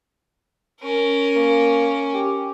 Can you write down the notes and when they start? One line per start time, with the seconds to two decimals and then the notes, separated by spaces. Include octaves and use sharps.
0.81 C#4 A#4
1.35 A#3
2.14 G4